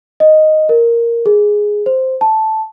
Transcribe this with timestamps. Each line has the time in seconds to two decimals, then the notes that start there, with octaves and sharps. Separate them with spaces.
0.20 D#5
0.69 A#4
1.26 G#4
1.86 C5
2.21 A5